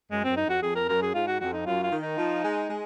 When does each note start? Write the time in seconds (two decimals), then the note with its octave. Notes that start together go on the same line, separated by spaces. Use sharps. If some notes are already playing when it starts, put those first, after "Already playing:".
0.11 F#2 G#3
0.24 C4
0.29 F#2
0.37 D#4
0.46 F2 F#4
0.62 F2 G#4
0.76 A#4
0.89 F#2 A#4
1.02 G#4
1.15 G#2 F4
1.28 F#4
1.41 F2 F#4
1.53 D#4
1.66 F#2 F4
1.83 F4
1.92 D#3
2.01 D#4
2.17 F3
2.44 G#3
2.70 G#3